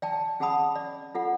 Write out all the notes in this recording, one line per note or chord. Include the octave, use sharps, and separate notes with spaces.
D5 G5 A5
C#4 G#4 F#5 A5 B5 D#6
D5
F4 A4 F#5